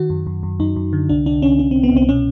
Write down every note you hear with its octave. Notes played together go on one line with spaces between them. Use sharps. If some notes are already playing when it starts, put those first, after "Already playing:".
Already playing: D#3 F#4
F#2
F#2
F#2
F#2 D#4
F#2
D3
C2 D4
C2 D4
C2 C#4
C2 C#4
C4
C2
B3
C2 C4
B2 C#4